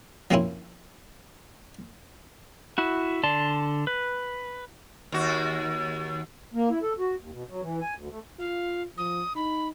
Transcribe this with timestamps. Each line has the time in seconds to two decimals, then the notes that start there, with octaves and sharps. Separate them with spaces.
0.31 F3 A#3 C4 C#4 E4
2.78 E4 F#4
3.24 D3 D5 A5 C6
3.87 B4
5.12 D#2 F#4
6.54 A#3
6.70 E4
6.82 A4
6.99 F#4
7.19 D#2
7.31 B2
7.49 F#3
7.61 E3
7.81 G#5
7.95 D2
8.10 A3
8.39 F4 F5
8.97 F3 D#6
9.36 D#4 B5